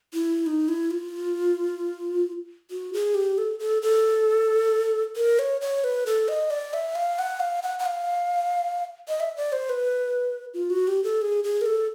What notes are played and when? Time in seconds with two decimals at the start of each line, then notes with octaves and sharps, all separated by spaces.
0.13 E4
0.46 D#4
0.68 E4
0.91 F4
2.71 F#4
2.93 G#4
3.15 G4
3.38 A4
3.59 A4
3.82 A4
5.16 A#4
5.39 C#5
5.61 C#5
5.84 B4
6.06 A4
6.28 D#5
6.50 D5
6.73 E5
6.95 F5
7.19 F#5
7.40 F5
7.63 F#5
7.79 F#5
7.86 F5
9.08 D#5
9.20 E5
9.37 D5
9.52 C5
9.70 B4
10.54 F4
10.70 F#4
10.87 G4
11.04 A4
11.22 G#4
11.44 G#4
11.61 A#4
11.66 A4